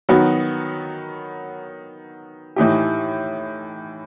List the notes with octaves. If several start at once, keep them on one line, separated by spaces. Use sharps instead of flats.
D#3 F#3 B3 F#4
A2 E3 A3 D#4 G4